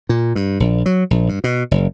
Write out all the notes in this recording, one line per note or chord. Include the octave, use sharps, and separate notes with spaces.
A#2
G2
A#1
F#3
A#1
G2
B2
F#1